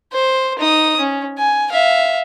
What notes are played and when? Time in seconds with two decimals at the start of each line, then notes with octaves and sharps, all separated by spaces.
0.13 C5
0.59 D#4 D#6
1.00 C#4
1.38 G#5
1.72 E5 F5